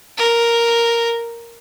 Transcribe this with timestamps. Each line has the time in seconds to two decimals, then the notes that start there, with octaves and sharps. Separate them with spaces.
0.18 A#4